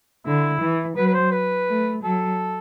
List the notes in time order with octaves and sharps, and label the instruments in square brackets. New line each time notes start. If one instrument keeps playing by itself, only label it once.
[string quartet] D3 [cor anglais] E4
[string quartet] E3
[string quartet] F#3 [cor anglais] B4
[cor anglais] B4
C5
B4
[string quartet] A3
[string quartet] F#3 [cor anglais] A4